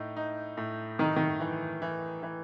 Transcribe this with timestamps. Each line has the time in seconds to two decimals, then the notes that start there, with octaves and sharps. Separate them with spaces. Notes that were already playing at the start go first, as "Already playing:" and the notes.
Already playing: A2 D#4
0.17 D#4
0.57 A2
0.99 D#3 D#4
1.16 D#3
1.40 E3
1.82 E3
2.23 E3